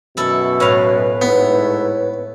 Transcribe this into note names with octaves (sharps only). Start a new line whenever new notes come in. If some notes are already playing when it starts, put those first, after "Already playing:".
F#2 B2 E4 A4
A2 B4 C#5 F5
G#2 A3 B3 E4